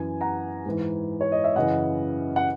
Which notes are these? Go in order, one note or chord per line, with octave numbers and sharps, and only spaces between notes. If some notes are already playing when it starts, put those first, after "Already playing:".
Already playing: F#2 E3 G#5
F#5 A#5
G#2 E3
C#5
D#5
E5
F#2 C#3 E3 D#5 F#5
F#5